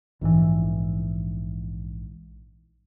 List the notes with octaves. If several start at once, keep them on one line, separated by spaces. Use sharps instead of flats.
A#1 G#2 C3 E3